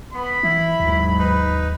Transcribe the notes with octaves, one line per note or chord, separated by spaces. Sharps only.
B3 B5
E3 E4
D#2 G#2 F#3
D#4 B4